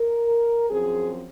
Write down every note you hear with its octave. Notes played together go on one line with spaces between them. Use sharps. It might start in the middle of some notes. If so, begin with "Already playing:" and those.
Already playing: A#4
F#2 F3 C4 G#4